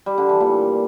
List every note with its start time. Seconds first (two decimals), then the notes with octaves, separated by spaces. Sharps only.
0.06 G3
0.18 D3
0.29 E3
0.41 A#2